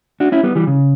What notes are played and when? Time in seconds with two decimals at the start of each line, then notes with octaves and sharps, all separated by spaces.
0.20 D4 F#4
0.32 C#4 E4
0.43 G3 B3
0.55 E3 G3
0.67 C#3